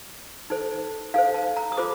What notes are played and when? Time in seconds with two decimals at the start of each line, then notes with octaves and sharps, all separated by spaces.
0.50 D#4 A4 C5
1.14 D#4 A4 C5 F5
1.34 A5
1.57 A#5
1.72 D#6
1.77 F4 A4 C5 D6